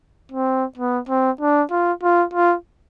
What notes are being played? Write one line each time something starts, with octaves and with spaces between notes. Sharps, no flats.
C4
B3
C4
D4
F4
F4
F4